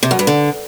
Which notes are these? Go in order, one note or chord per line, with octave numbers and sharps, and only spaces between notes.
C3
F#2
G2
D3